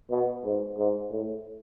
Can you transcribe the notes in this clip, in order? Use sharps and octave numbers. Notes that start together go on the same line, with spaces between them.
B2
G#2
G#2
A2